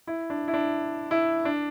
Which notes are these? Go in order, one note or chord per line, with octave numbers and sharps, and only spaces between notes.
E4
D4
E4
D4
E4
D4